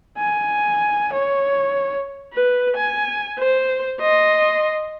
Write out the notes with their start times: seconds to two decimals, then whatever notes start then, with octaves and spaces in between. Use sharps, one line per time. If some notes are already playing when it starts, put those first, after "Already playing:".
0.18 G#5
1.13 C#5
2.33 B4
2.77 G#5
3.39 C5
4.01 D#5 C6